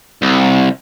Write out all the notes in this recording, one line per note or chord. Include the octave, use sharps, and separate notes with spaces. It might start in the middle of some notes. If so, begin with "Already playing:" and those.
C2